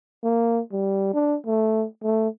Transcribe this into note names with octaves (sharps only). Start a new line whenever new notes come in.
A#3
G3
D4
A3
A3